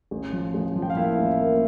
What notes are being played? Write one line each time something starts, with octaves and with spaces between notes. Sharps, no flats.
A1
F3
A1
F3
G5
F5
A#3 E4 E5
A1
A#3